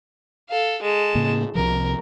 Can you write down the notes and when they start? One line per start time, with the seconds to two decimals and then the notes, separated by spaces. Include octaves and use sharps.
0.49 A4 F5
0.83 G#3 A5
1.15 A2 C#3 A#3
1.55 C2 C3 F3 A#4